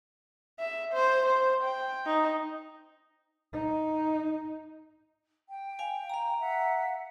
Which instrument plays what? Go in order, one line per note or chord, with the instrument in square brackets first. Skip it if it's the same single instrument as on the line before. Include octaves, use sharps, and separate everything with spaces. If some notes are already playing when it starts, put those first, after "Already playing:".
[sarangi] E5
C5
C5
G5
D#4
[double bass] D#4
[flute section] G5
[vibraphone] F5 G#5
F5 A#5
[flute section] E5 F#5